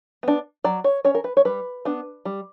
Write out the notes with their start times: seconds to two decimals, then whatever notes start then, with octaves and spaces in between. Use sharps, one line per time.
0.23 B3 D4
0.64 F#3 D5
0.84 C#5
1.05 C#4 C#5
1.15 A#4
1.24 B4
1.37 C#5
1.45 G3 B4
1.85 B3 D4
2.25 G3